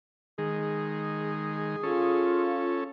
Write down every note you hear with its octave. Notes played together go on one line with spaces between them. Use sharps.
D#3 G#3 G#4
C#4 F4 A4